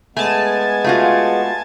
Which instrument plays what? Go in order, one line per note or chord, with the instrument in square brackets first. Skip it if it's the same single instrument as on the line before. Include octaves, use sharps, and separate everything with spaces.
[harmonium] G#3 B3 [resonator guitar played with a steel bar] A3 [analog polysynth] G#5 A5
[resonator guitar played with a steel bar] A3 F4 F#4